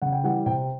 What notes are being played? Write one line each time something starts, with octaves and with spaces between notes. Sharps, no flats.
C#3 F#5
G5
E3 G3 F#5
C3 G5